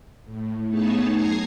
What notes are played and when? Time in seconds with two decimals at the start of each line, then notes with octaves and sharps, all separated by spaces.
0.24 A2
0.68 A3 B3 D#4 G#4 C#5 A5
1.11 F#2 A#5 G#6 A#6 C7